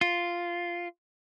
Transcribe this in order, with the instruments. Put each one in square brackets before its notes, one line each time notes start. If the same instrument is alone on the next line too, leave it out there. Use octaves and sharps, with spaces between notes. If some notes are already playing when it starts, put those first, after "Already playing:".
[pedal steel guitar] F4